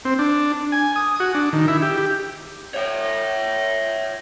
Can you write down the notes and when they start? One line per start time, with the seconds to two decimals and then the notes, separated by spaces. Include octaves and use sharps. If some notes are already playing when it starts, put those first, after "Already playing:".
0.05 C4
0.19 D4
0.72 G#5
0.96 D#6
1.20 F#4
1.35 D4
1.53 D#3
1.68 E4
1.82 G4
1.98 G4
2.74 C#5 E5